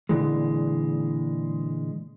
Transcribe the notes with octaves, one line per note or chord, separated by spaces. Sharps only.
A#2 D3 E3 G#3